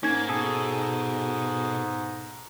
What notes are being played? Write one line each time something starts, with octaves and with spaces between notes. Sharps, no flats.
G#2 A#3 C#4 D#4 G#6
B2 G#4 A4